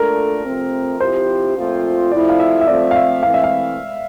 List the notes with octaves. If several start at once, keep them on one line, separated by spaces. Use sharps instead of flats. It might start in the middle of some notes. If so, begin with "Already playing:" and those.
Already playing: A#2 A3 D4 A4 A#4
C3 F3 A3 C4
C3 F3 C4 E4 G4 C5
A#2 F3 A3 C4 F4
C3 F3 A3 E4 D5
F5
E5
E5
F3 A3 C4 D5
F5
E5
E3 A3 C4 F5
E5
F5